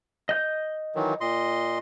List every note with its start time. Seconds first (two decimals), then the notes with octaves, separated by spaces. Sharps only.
0.29 D#5 G6
0.95 D#3 E3 F#3
1.21 A#2 D#5 C6